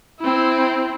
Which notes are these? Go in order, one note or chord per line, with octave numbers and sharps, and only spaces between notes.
C4 E4